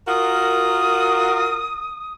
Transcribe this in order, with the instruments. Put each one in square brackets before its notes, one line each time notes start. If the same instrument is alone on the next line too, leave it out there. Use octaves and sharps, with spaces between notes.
[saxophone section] F4 F#4 A#4 [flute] D#6